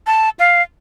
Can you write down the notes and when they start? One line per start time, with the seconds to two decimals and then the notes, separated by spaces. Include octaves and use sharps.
0.07 A5
0.39 F5